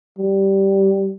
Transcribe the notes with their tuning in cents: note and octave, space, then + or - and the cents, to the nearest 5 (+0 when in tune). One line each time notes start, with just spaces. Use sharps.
G3 -10